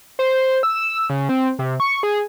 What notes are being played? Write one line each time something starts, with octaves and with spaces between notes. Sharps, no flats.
C5
E6
C#3
C4
C3
C#6
G#4